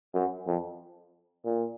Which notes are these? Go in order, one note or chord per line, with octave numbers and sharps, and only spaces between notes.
F#2
F2
A#2